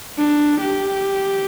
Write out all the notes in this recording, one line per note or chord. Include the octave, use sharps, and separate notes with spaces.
D4
G4